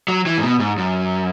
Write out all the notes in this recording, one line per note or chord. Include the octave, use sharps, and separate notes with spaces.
F#3
E3
G#2
B2
G#2
F#2